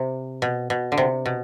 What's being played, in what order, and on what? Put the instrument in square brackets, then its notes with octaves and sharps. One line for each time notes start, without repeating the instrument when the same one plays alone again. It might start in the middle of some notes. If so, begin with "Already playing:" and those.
Already playing: [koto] C3
B2
B2
D3
C3
B2